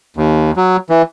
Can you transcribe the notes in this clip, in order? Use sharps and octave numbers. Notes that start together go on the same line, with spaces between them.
D#2
F#3
E3